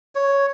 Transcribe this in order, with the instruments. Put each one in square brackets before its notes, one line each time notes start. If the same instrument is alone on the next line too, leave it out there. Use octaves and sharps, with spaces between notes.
[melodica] C#5